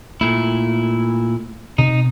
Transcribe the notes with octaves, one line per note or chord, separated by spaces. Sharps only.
A#2 A3 E4
B2 C4 D#4